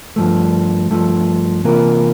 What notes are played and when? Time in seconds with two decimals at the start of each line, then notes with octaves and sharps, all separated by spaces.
0.16 G2 F3 A3
0.90 G2 F3 A3
1.64 C3 E3 A#3 F4 A#4